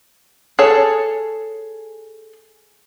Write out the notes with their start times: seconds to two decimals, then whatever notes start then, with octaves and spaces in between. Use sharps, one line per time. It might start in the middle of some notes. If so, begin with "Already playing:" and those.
0.59 G#4 A4 C#5 A5